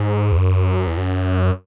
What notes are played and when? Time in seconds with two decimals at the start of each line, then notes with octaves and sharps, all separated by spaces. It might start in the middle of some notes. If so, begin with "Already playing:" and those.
Already playing: G#2
0.32 E2
0.37 F#2
0.87 E2
0.97 F#2